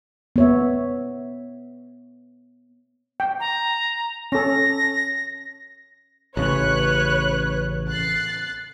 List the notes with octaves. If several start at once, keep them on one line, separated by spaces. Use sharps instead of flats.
B3 C#5 E5
G5
A#5
C#4 A4 A#6
A1 C#3 B4 C#5 F#6
F#6 A6 C7